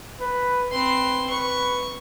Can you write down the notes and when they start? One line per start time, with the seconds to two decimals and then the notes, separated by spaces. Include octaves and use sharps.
0.20 B4
0.72 C4 B4 C6
1.30 B4 C#6